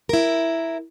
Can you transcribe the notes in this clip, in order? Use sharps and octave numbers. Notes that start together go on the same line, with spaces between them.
E4 A#4